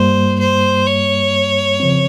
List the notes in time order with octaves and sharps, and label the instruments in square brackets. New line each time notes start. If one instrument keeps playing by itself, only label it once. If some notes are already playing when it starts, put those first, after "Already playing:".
Already playing: [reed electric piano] G2 G3 A#3 [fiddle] C5
[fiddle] C5
C#5
[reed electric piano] C#3 F3 C4